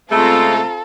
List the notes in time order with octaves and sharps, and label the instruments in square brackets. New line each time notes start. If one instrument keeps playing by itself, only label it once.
[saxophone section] C#3 G#3 A3 [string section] C4 F4 A#5 [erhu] A4